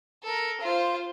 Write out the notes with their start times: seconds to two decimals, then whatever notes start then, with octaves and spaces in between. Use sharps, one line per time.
0.23 A4 A#4
0.60 F4 C5